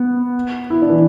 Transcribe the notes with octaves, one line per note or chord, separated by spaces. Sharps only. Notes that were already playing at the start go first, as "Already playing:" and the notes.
Already playing: B3
E4
D4
E3